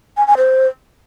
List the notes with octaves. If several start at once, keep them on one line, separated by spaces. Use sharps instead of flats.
G#5
G#5
C5